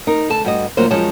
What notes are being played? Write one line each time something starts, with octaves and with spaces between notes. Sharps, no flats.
D#4 A#4
D2 A4 A5
G2 F#4 D#5
D2 A2 F3 F#3 A#3 C5
F#2 F3 G#3 C#4 C#5 A5